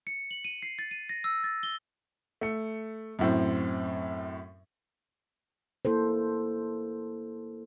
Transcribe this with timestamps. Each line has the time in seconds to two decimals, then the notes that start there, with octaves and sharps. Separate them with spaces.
0.07 C#7
0.31 F#7
0.45 D#7
0.63 C7
0.79 A6
0.91 D#7
1.09 A#6
1.24 E6
1.44 A6
1.63 G7
2.41 A3 C#7
3.19 F#2 A2 C4
5.85 A#3 E4 A4 C5